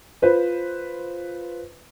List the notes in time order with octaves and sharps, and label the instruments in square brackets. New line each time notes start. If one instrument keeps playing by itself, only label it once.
[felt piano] F4 B4 C5